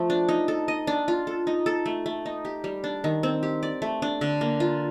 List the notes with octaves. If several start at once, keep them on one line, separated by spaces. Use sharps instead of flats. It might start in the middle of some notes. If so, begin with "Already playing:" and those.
Already playing: F3 A3
D4
D#4
A4
D#5
D4
F4
A4
D#4
A4
A3
A3
D#4
G4
G3
D4
D#3
C4
G4
D5
A3
D4
D3
A#3
F4